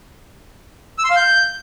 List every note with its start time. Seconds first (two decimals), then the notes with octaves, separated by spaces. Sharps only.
0.98 E6
1.04 C6
1.10 F5
1.16 G6